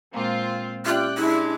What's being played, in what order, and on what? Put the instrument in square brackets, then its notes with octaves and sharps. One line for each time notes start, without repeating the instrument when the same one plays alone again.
[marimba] A#2 G#3 A#3 [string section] C4 F4
[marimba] C#4 G4 E5 [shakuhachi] F4 [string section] D5 G5 F#6
[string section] G#3 D4 [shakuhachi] E4